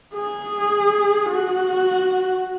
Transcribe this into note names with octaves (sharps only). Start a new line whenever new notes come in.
G#4
F#4